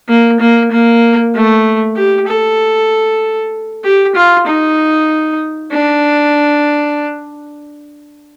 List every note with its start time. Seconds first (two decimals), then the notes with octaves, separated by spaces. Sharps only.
0.09 A#3
0.40 A#3
0.72 A#3
1.34 A3
1.97 G4
2.28 A4
3.84 G4
4.15 F4
4.47 D#4
5.72 D4